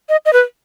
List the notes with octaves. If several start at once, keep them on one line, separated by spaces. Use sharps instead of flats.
D#5
D#5
B4